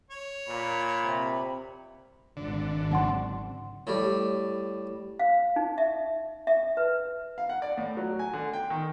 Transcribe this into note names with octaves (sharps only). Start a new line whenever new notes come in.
C#5
A#2 B5
C3
G#1 D3
C#3 F#3 C4 D#4 F#5 C6
A2 G3
F5
D#4
E5
E5
B4
F5
F#5
D5
A2
F#3
G#5
D3
G5
D#3